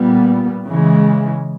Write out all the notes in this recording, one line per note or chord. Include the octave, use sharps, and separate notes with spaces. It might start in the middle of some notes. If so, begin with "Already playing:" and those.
Already playing: A#2 G3 B3
C#3 E3 G#3